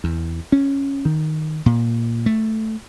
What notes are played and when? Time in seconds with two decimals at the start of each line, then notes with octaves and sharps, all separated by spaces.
0.04 E2
0.52 C#4
1.05 D#3
1.66 A#2
2.26 A3